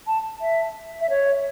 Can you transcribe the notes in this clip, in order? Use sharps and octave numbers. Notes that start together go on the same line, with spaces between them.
A5
E5
E5
C#5